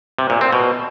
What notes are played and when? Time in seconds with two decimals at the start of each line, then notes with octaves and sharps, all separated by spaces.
0.19 C3
0.30 A#2
0.41 C4
0.53 B2